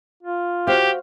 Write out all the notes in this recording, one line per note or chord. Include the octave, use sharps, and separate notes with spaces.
F4
F#4 G4 C5 F5